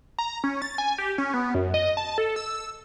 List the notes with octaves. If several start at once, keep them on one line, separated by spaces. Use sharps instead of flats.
A#5
C#4
A6
G#5
G4
C#4
B3
F#2
D#5
A5
A4
E6